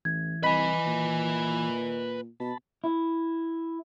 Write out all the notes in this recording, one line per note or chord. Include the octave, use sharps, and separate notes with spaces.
A1 E3 G#6
C2 B4 D#5 G#5 B5 B6
A#2
B2 A5 B5
E4